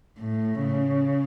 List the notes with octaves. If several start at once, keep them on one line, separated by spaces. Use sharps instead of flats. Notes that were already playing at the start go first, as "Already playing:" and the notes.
A2
C#3